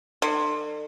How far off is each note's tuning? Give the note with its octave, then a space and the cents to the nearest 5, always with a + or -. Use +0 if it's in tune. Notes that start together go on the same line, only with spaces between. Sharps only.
D3 +40